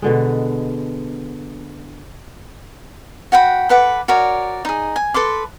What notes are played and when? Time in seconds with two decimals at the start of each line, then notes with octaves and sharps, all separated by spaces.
0.02 B2 D3 G#3
3.32 F#4 F#5 G5 B5
3.69 A4 B4 F#5 D6
4.08 F#4 A#4 C#5 D5
4.65 D#4 G#4
4.96 G#5
5.14 A4 B4 C6 D6